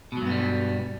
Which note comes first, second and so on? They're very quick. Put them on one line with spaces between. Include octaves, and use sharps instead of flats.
B2 F#3 G2 B3 G3